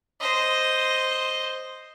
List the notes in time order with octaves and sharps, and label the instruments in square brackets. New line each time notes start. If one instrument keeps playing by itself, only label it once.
[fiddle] C5 D#5